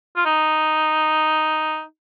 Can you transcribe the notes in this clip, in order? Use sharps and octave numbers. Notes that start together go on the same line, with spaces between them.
F4
D#4